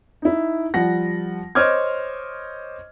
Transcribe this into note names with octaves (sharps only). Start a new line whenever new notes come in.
D#4 E4
F3 G3 F#5 A#6
C5 C#5 D#5 D6 F6 G#6